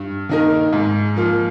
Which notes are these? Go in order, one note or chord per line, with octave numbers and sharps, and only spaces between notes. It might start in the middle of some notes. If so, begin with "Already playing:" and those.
Already playing: G2
D#3 A#3 D#4 A#4
G#2
F3 A#3 F4